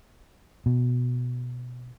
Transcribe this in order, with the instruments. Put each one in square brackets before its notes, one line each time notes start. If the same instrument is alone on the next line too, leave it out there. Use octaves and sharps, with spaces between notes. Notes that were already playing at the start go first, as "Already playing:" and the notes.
[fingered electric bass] B2